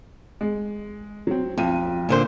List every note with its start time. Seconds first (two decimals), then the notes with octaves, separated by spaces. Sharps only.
0.41 G#3
1.27 F#3 C4
1.58 B1 F2 D#7
2.09 A#2 D3 C5